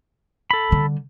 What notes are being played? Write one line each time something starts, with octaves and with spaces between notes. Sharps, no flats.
A4 B5
D3 G3